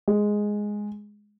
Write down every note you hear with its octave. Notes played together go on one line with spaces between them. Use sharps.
G#3